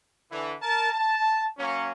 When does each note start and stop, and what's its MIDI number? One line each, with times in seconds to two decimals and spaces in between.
0.31 0.53 50
0.31 0.53 52
0.61 0.90 70
0.61 0.90 81
0.91 1.44 81
1.58 1.92 54
1.58 1.92 58
1.58 1.92 61